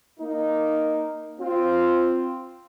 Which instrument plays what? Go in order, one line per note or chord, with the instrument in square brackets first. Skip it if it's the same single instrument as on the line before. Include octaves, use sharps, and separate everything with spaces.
[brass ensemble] A#3 D#4
C4 F4